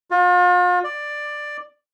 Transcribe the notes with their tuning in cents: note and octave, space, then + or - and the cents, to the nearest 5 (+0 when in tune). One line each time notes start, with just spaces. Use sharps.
F4 +40
D5 +10